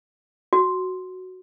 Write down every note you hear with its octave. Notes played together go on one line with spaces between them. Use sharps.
F#4